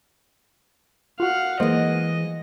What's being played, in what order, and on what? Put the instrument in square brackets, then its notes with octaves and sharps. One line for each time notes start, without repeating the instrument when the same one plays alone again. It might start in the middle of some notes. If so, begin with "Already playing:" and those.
[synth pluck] F4 F#4 [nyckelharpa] F5 F#5
[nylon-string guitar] E3 G#3 [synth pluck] A#3 C5 [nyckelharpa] D#5